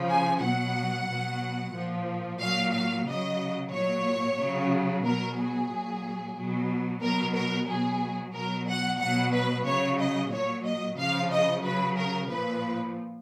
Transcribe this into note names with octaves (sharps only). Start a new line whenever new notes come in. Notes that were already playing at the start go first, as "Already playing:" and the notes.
Already playing: C#3 F3
G#5
B2 F#3 F#5
B2 F#3
A#2 F3
A#2 F#3 F5
F5
C#3 F#3 D#5
A#2 F#3 C#5
C#3 F#3
B2 F#3 A#4
G#4
A#2 F#3
B2 F#3
B2 F#3 A#4
A#4
B2 F#3 G#4
B2 F#3 A#4
F#5
B2 F#3 F#5
B4
C#3 F#3 C#5
D#5
A#2 F#3 C#5
D#5
C#3 F3 F5
D#5
C#3 F#3 B4
A#4
A#2 F3 B4